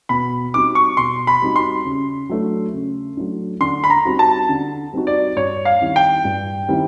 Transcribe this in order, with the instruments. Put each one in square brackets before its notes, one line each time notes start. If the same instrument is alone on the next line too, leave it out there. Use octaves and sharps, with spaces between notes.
[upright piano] B2 [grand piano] B5
[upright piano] G3 C4 D#4 F#4 [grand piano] D6
[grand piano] C#6
[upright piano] B2 [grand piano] C6
[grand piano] B5
[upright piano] G3 C4 D#4 F#4
[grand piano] C6
[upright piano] C#3
F#3 A3 D4
C#3
F#3 A3 D4
[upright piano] D3 [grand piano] C6
[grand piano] B5
A#5
[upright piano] G3 C4 D#4 F#4
[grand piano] A5
[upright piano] D3
G3 C4 D#4 F#4
[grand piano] D5
[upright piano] G2 [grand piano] C#5
[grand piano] F5
[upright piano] D#3 G3 C4 E4
[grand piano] G5
[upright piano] G2
D#3 G3 C4 E4